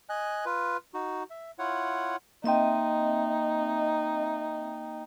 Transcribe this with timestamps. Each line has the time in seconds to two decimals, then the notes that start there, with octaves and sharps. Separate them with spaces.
0.10 D#5 G#5 F#6
0.46 F4 B4
0.94 D#4 F#4
1.30 E5
1.59 E4 F4 C#5 F#5
2.44 A#3 C4 D#4 D#5 E5 G5